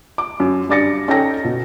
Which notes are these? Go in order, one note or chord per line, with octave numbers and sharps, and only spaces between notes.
D6
F#2
G2 D5 D6 A6 A#6 C#7
C#4 D#4 A4 G5 A#6
B2